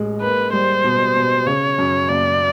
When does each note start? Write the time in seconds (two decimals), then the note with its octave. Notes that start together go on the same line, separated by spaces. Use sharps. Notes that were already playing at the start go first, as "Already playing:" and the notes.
Already playing: A1 G#3
0.21 A#3 B4
0.53 G3 C5
0.84 B2
1.16 B2
1.46 C#3 C#5
1.78 F#2
2.09 F#1 D5